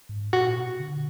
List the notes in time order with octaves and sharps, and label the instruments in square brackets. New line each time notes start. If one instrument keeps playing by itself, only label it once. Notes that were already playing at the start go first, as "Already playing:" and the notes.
[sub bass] G#2
[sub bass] A#2 [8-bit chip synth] F#4
[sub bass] B2
D3